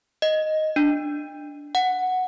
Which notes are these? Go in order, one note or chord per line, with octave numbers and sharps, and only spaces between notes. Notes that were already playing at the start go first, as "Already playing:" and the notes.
D#5
D4
F#5